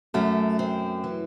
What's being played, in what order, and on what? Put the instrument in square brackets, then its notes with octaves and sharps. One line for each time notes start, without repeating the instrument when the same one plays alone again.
[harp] F#2 [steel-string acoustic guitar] A3
[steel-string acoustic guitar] C4
E3